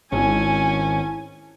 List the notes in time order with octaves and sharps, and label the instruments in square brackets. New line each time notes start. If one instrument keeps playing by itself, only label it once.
[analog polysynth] G#1 [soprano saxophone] C#4 [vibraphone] E4 A5 [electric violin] G#5